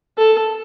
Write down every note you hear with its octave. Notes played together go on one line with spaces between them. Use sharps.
A4